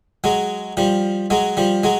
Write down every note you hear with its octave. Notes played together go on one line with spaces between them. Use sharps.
F#3 G#3
F3 G3
F#3 G#3
F3 G3
F#3 G#3